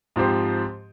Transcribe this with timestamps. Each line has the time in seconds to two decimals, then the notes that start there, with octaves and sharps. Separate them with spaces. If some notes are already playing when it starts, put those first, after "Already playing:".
0.16 G#2 F3 C4 G4 C5